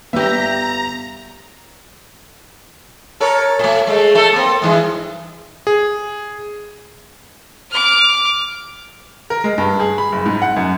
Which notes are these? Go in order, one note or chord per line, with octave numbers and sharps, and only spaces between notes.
G1 B3 G4 E5 A#5
A4 A#4 C#5
A#2 A3
G#3 A3
A3 A4
A#3 C4
G2 E3 G#3
G#4
D6 F6
A#4
G#3
G2
G#4
B5
F#1
G#2
F#5
F#2